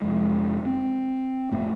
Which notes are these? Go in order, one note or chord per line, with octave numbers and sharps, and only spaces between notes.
F1 F2 G#3
C4
A1 F2 A3 C4